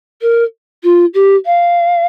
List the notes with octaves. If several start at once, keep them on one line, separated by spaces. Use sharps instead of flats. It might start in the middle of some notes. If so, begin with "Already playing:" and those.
A#4
F4
G4
F5